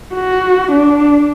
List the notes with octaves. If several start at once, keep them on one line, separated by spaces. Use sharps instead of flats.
F#4
D4